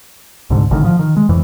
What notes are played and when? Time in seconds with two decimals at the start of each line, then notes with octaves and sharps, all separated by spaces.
0.50 C2 G#2 D3
0.71 G#1 A2 D3 D#3
0.84 F3
0.99 D#3
1.17 G#3
1.29 F2 E3